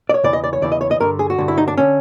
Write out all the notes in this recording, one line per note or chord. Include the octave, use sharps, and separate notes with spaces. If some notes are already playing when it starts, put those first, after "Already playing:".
D5
C#5
E2 C#3 E3 D5
D#5
D5
C#5
E2 C#3 E3 D5
D#5
C#5
D#5
G2 D3 A#4
G#4
F#4
G2 D3
E4
D#4
D4
D3 C#4